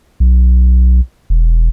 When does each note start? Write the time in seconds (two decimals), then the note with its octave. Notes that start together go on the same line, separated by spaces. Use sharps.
0.20 B1
1.30 E1